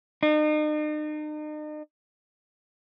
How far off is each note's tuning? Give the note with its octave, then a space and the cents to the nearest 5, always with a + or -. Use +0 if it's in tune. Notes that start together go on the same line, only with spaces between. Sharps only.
D#4 -40